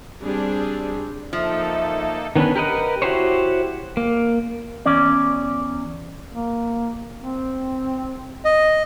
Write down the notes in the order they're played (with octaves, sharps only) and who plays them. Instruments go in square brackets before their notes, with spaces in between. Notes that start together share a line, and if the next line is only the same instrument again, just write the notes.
[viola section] G3 C4 D4 G#4
[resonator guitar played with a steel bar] F3 [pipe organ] A#3 D#4 A4 [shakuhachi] E5
[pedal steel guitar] D#3 B3 C#4 D4 B4
G4 A#4 B4 D#5 F#5
E4 F#4 G4 C5 C#5
A#3
[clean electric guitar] E2 C#4 D5
[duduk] A#3
C4
[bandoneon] D#5